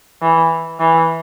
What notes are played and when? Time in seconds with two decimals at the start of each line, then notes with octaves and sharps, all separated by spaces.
0.22 E3
0.80 E3